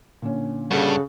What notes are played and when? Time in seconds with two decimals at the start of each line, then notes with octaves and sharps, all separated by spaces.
0.22 A#2 D3 C#4
0.71 G2 C#3 G3 F#4 A4